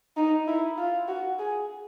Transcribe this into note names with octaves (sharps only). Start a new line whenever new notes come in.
D#4
E4
F4
F#4
G#4